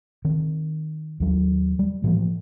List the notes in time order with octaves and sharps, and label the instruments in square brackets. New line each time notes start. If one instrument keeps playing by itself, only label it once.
[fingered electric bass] D#3 C4
D#2 F#3
G3
A2 E3 F3 A#3